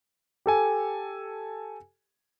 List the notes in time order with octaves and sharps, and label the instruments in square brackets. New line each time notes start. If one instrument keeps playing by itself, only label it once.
[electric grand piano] G4 A4 G#5